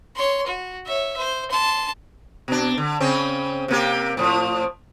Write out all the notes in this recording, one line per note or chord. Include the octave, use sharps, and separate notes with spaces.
C#5 C6
F#4
C#5 E5
C5
A5 C6
B2 D4
D3
C#3 C4 C#4
C3 A#3 G4
A2 F3